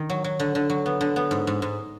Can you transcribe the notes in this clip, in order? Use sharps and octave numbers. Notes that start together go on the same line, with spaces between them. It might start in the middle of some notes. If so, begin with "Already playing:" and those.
Already playing: D#3
F#3
F#3
D3
D3
F#3
B3
D3
B3
G#2
G#2
G#2